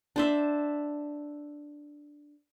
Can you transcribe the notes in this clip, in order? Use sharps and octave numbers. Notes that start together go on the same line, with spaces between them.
D4 C5 E5